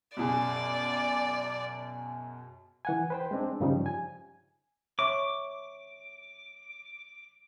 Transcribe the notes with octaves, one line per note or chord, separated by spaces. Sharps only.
F#2 B2 G#4 D5
E3 F#5 G#5
B4 C5 G5
G#3 C4 D4
G2 C#3 F3 G3 D#4
G#5
C#5 E5 C#6 D6